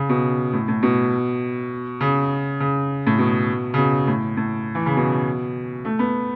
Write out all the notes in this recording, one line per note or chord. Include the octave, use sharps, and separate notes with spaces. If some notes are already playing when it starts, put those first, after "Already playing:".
Already playing: C#3
B2
A2
A2
B2
C#3
C#3
A2
B2
C#3
B2
A2
A2
E3
C#3
B2
A3
B3